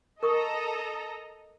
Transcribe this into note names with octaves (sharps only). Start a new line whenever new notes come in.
A4 A#4 D#5 A#5 C#6 D#6